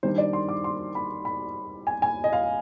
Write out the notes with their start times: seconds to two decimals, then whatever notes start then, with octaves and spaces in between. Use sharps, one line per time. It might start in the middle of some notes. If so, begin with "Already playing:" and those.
0.03 D#3 G3 D4 C5
0.18 D5
0.33 C6
0.49 D6
0.64 C6
0.95 B5
1.25 B5
1.87 G#5
2.02 G#5
2.24 D#5
2.33 F5